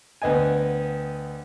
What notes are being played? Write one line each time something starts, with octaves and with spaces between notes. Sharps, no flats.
D2 B3 D#5 G5 G#5